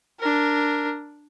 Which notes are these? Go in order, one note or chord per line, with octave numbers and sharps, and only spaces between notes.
D4 A#4